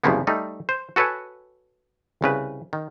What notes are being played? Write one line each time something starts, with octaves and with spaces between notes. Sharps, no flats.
C2 F#2 C#3 F3 A#3 B3
G3 A3 D#4
C5
F#4 A4 B4 C#5 F#5 G#5
C2 C#3 B4
D#3